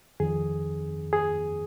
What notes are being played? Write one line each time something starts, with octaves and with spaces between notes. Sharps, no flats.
F2 D#3 G#4
G#4